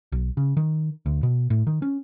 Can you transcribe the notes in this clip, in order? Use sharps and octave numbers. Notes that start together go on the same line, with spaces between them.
B1
C#3
D#3
D2
B2
A2
D#3
C#4